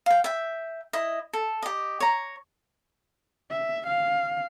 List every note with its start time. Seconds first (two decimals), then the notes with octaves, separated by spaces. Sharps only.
0.06 F5 G5
0.24 E5 G5
0.93 E4 D#5
1.33 A4
1.63 G4 D#5
2.00 C#5 A#5
3.51 E5
3.87 F5